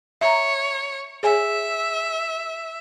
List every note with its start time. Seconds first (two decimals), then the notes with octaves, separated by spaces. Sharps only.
0.21 C#5 E5 A#5
1.23 G#4 C#5 E5 G#5